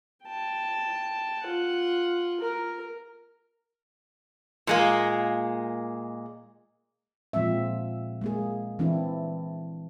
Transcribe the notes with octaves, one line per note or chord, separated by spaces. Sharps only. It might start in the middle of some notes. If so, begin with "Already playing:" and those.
G5 A5
F4 F#5
A#4
A#2 G#3 A#3
A#2 F3 G#3 C4 E5
G#3 A#3 G#4
E3 C4 D4 E4